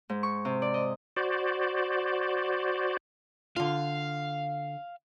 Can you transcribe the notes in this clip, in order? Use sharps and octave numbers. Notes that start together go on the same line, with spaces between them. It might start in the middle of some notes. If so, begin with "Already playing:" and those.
G#2
C#6
C3
D5
D#5
F#4 C5 D5
D3 F4 F5